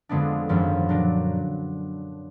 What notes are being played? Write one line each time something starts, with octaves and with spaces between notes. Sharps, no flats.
F2 D3 G#3 B3 D4
G#1 F#2 F3
A#2 F#3 D4